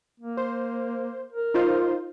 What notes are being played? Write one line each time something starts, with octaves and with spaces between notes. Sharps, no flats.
A#3
C5
A#4
D#4 F4 C5